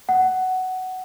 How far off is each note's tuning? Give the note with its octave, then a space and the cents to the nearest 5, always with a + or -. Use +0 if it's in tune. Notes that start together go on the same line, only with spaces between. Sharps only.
F#5 +10